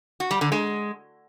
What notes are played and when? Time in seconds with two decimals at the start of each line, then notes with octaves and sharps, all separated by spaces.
0.20 F#4
0.31 G3
0.41 D3
0.52 G#3